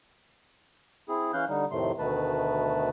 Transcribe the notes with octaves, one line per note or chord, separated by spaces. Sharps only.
C4 E4 G#4
E3 C#4 F5 F#6 G6
D3 G3 D#4
F2 A2 C3 D#3 A3 C6
D2 B2 D#3 A3 B4 A5